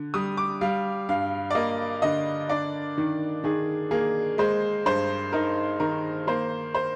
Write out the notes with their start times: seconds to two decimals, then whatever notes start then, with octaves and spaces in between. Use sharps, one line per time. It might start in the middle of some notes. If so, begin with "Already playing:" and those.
Already playing: D3
0.14 G3 D#6
0.37 D6
0.61 G3 F5
1.09 G2 F5
1.50 D5
1.55 A#3 D#5
2.02 D3 D#5
2.49 D4 D5
2.97 D#3
3.44 D#3 G#4
3.91 A#3 G#4
4.38 G#3 C5
4.86 G2 C5
5.32 D#4 A#4
5.80 D#3 A#4
6.27 A#3 C5
6.74 C5